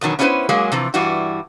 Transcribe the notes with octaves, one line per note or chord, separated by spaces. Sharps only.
E2 B2 D#3 F#3
B3 C#4 E4 G#4 B4 C5
F#3 G#3 A#3 G#4
C3 E3 F3
G2 E3 G3 E4 F#4